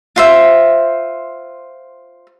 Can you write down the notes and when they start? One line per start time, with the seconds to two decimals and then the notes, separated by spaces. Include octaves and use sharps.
0.16 F4 C5 E5